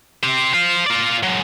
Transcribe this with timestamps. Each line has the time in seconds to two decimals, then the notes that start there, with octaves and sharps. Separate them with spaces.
0.24 G4 C5
0.54 C5 F5
0.86 F4 D5
1.23 F#3 G#3